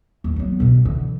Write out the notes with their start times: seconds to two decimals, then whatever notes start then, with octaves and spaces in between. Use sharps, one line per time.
0.24 D#2
0.36 F#3 B3
0.60 B2 D3
0.85 D3 E3